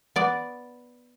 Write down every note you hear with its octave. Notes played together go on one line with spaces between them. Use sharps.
B3 D5